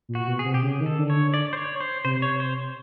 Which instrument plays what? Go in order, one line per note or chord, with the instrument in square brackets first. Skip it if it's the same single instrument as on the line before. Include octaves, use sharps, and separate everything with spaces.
[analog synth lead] A#2
[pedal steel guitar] F#4
[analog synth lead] B2
[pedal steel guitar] G#4
[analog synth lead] C3
[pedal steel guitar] G4
[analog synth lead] C#3 [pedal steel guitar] G#4
[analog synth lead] D#3
[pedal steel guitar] A4
[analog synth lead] D3
[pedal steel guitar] C#5
[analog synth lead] D3
[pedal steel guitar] D5
C5
C#5
C5
[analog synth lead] C3 [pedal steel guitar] C5
[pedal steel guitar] C#5
C5